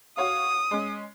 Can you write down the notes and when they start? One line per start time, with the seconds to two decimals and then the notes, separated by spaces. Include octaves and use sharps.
0.17 F#4 C#5 F5 D#6
0.71 G#3 C#4